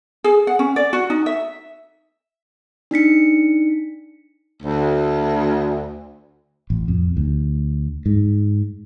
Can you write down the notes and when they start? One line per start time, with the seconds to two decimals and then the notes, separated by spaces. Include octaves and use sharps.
0.24 G#4
0.47 F#5
0.59 C#4
0.76 D5
0.93 F#4
1.10 D#4
1.26 E5
2.91 D4 D#4 B6 C#7
4.63 D2
6.70 A1
6.88 F2
7.17 D2
8.06 G#2